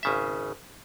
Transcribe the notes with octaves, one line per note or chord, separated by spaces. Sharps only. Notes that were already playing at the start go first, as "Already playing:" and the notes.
G#1 C#3 E5